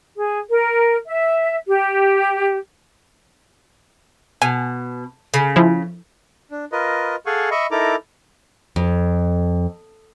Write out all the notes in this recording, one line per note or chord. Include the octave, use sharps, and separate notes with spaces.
G#4
A#4
E5
G4
B2 G#5
C#3
F3 E4
D4
F4 A#4 B4 D#5
G#4 A4 F5 F#5 G#5 C#6
D#5 E5 B5 C#6
D#4 E4 A4 A#4 A#5 D6
F2